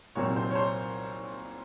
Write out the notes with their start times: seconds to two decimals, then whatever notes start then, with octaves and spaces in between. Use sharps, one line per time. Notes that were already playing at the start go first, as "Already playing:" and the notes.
0.15 C2 A#2 F#3 C4 C#5
0.36 C5
0.51 C#5
0.55 C5